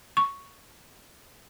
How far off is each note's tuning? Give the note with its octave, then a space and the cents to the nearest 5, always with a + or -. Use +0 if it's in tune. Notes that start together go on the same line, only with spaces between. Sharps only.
C#6 +5